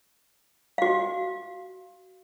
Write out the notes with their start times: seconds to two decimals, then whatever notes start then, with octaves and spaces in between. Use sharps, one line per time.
0.78 F#4 F5